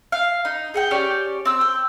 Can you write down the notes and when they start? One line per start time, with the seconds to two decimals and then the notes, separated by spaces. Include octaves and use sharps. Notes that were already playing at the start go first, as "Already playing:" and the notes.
0.12 F5
0.45 D#4
0.74 G#4 F#5 G5
0.91 C#4 G4 C#5 D5
1.45 C4 E6
1.61 G5